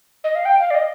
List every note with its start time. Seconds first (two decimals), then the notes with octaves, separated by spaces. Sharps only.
0.24 D#5
0.35 F5
0.45 G5
0.60 F5
0.70 D5
0.74 D#5